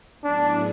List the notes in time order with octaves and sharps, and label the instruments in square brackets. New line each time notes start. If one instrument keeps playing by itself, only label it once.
[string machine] A2 F#3 B3 E4 G#4 [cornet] D4